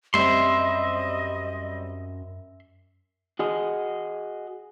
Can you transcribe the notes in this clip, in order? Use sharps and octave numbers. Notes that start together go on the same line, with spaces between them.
F#2 G3 C4 D#5 E5 C6
F#4 G#4 D#5